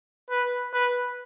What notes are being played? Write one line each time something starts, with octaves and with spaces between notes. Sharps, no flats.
B4
B4